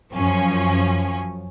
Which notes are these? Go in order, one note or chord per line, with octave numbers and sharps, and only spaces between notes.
F#2 F3 C#4